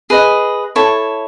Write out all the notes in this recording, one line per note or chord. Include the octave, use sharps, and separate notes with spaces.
G#4 B4 D#5
E4 A4 C#5